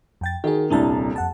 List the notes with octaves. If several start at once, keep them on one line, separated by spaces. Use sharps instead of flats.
F2 G5 A6
D#3 F#4 G#4
D#1 C2 D4 E4 A5
F2 F#5 A5